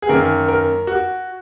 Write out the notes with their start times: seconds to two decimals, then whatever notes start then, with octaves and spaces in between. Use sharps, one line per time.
0.02 G#4
0.09 F#2 D#3 A#3 A#4
0.48 A#4
0.87 F#4